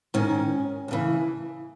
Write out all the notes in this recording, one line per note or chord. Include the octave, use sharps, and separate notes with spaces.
G#2 D#3 C#4
D2 C#3 E3